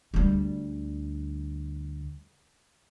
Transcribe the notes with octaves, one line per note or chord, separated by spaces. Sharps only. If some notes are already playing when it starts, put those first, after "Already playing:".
D2 G3